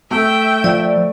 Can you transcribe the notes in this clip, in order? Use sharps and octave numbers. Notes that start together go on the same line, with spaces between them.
A3 E5 G5
F3 D5